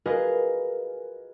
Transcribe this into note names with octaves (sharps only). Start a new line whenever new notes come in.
F4 F#4 G#4 A#4 B4 D#5